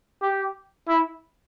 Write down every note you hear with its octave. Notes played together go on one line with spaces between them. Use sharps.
G4
E4